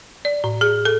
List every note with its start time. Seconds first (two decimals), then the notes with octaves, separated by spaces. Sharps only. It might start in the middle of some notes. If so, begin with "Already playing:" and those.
0.25 D5
0.44 A2
0.61 G#4
0.85 A4